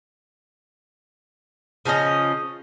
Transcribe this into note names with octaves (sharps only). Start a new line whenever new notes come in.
C#3 F3 C#4 D#5